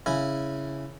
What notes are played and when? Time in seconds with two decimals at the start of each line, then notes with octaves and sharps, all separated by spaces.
0.06 C#3 E4 G#5